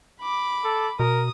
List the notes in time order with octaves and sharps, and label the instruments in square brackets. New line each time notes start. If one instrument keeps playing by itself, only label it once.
[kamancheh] B5 D6
[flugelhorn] A4
[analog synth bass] B2 [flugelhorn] A#4 [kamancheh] D#6